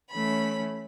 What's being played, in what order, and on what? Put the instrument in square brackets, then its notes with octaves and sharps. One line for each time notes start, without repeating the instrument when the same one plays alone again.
[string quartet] E3 A3 C#4 B5